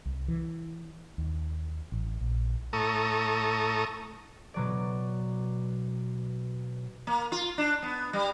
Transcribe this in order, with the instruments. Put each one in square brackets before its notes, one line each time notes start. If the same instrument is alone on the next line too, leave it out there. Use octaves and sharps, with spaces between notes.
[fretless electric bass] C2
E3
D#2
A1
A#1
[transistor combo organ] A2 A4 A#5 C#6 D#6
[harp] B2 F#3 D5
[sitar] A#3
F4
D4
B3
G3